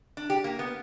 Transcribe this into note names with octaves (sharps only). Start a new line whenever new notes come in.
D4
G4
A#3
B3